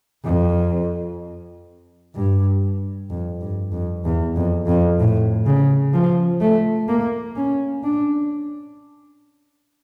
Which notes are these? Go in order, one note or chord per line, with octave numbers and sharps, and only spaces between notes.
F2
G2
F2
G2
F2
E2
F2
F2
A2
C#3
F3
A3
A#3
C#4
D4